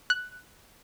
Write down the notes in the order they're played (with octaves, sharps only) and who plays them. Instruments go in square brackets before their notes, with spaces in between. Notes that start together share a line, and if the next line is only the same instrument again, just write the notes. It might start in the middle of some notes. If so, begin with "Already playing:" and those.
[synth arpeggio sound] F#6